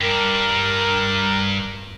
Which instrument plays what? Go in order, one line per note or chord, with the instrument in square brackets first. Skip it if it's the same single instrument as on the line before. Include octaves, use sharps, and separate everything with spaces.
[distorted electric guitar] G2 D4 [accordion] A#4